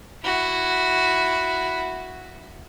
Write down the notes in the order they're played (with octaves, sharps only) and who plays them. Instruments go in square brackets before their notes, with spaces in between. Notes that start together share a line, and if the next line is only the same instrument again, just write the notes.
[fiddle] E4 F#4